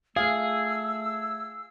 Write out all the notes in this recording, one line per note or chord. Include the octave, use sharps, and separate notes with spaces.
A3 G#4 F5 E6